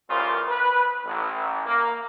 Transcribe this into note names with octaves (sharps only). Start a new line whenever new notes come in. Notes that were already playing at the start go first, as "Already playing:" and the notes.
A1 C#3 G3 F4 A#4 C5
B4
A1
A#3